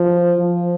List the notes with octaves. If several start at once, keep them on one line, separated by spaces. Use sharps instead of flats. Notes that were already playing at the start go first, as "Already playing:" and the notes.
Already playing: F3
F3